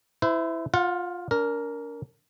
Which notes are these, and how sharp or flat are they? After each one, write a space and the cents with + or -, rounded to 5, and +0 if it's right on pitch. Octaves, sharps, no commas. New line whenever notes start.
E4 +0 C5 -40
F4 +10 F#5 -25
D4 -40 A#4 +0